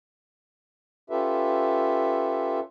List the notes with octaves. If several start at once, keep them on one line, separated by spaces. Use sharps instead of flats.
C#4 F4 G4 A4 B4 E5